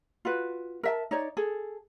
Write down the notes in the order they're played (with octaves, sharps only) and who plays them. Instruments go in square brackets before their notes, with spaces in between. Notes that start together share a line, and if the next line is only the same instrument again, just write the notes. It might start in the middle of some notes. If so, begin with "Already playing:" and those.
[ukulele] F4 F#4 B4
A#4 E5 A5
D#4 C#5 D5
G#4 A4